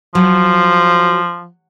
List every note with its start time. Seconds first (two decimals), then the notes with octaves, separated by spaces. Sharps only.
0.15 F3 F#3